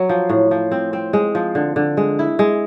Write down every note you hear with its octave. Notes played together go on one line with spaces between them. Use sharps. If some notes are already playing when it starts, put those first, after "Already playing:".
Already playing: F#3
F3
A2
F3
C4
C4
G#3
F3
D3
D3
G#3
E4
G#3